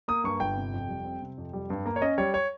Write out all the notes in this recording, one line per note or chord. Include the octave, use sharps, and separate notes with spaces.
A#3 D#6
G2 C#6
G1 G5
C3
F2
G3
C4
C3
F2
G3
G2
A#3
C#5
C#4 D#5
G3 C#5
C#5